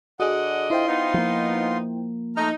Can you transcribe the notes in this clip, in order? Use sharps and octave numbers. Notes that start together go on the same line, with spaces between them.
D3 F#4 G#4 D5 D#5 F#5
E4 F4 C5 G5 C6
B3 D#4
F3 A#3
A3 D#4 A#5 F6